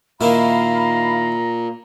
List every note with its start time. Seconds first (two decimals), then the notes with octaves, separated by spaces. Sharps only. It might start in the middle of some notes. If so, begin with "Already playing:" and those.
0.21 A#2 D#3 A#3 E4 F5 A#5 B5